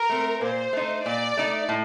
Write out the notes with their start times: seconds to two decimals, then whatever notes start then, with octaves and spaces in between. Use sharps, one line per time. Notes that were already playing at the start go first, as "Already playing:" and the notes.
Already playing: A#4
0.09 A3 C4
0.41 A#2 C5
0.73 A3 D#4
1.05 A#2 D5
1.37 A3 D#4
1.69 A2